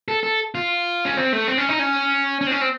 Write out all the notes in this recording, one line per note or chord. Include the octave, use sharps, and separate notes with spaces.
A4
A4
F4
C#4
C4
A3
C4
C#4
D#4
C#4
C#4
C4
C#4
C4